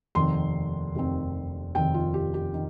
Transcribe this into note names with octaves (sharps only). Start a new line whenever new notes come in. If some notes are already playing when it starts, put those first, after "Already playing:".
F1 D#2 D#3 C4 C6
F1 D#2 D#3 C4
F1 D#2 D#3 C4 G5
F4
G4
G4
D#3